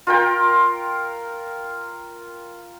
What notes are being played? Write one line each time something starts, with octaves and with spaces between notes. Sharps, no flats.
F4 A#4 G5